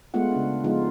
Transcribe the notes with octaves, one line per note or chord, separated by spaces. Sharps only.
G#3 A3 B3 F4 F#5
C#3 D4
F3 G#3 B3 D#4 F4